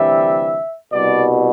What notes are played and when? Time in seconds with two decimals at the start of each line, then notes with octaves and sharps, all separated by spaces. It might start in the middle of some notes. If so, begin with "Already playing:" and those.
Already playing: D2 C3 E3 G3 E5
0.92 C2 B2 G3 D5